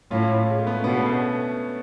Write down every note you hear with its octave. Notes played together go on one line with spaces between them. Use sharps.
A2 C#4 F4
G#3
A3
B3
C#4
B2 B3 D4
A3 C#4
A3 C#4